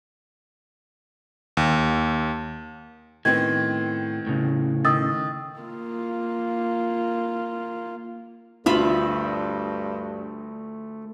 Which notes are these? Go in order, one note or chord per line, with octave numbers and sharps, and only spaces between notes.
D#2
A2 D#3 B3 C4 G#6
A2 C#3
D#3 D#6 E6 A6
A#3 F4
D2 G2 A3 F4 E5 B5